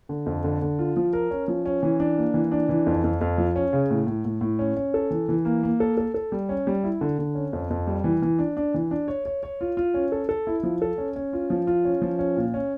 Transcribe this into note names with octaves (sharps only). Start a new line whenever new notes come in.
D3
F2
D3
D3
F4
F3
A#4
C#4
F3
C#4
E3
D4
A#3
E3
D4
E3
F2
F2
F2
F3
C#4
C#3
A2
A2
A2
A2
C#4
C#4
A4
E3
E3
A#3
A#3
A4
A4
A4
G3
C#4
G3
E4
D3
D3
C#4
F2
F2
G3
E3
E3
D4
D4
E3
D4
C#5
C#5
C#5
F4
F4
C#4
A4
A4
E4
F3
A4
C#4
C#4
F4
F3
F4
C#4
F3
C#4
A#2
C#4